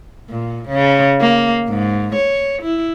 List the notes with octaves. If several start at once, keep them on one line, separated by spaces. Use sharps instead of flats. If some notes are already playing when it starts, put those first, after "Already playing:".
A#2
C#3
A#3
G#2
C#5
E4